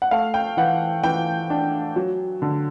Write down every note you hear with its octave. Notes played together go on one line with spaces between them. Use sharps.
F#5
A3 F5
G5
E3 F#5
E3 G5
D4
F#3
D3